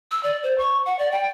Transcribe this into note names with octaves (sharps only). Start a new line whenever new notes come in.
E6
D5
C5
C#6
F#5
D5
G5